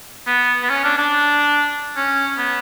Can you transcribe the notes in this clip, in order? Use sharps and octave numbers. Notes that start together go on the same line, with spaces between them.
B3
B3
C#4
D4
D4
C#4
B3